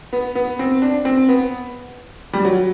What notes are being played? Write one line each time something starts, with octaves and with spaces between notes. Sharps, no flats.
B3
B3
C4
D4
C4
B3
G3
F#3